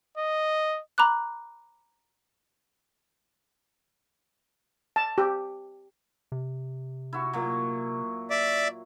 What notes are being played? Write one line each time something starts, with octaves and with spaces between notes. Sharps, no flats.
D#5
A#5 B5 D6 F#6
A5
G4
C3
E4 F#4
A#2 F#3
D5 E5 D6